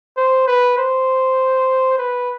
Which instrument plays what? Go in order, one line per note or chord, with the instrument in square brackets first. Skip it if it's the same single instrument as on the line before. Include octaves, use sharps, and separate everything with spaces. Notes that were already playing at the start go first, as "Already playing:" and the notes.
[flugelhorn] C5
B4
C5
B4